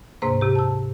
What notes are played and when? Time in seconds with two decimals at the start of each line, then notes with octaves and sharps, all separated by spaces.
0.22 D2 G#2 C3 A#3 C5
0.41 C3 G4
0.55 A5 E6